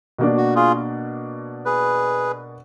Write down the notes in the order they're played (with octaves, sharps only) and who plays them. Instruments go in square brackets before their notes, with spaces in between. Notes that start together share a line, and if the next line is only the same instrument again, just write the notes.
[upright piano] B2 A#3 D4
[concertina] F#4
F4 G#4
G#4 B4